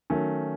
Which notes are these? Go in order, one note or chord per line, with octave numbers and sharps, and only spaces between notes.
D#3 F#3 A3 C#4